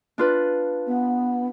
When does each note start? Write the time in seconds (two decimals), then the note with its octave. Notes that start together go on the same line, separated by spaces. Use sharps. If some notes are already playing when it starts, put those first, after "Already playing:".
0.18 D4 F4 B4
0.87 B3